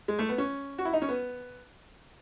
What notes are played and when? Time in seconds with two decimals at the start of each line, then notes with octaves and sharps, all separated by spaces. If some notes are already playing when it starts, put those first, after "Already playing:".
0.08 G#3
0.19 A3
0.29 B3
0.38 C#4
0.78 F#4
0.85 E4
0.93 D#4
1.02 C#4
1.09 B3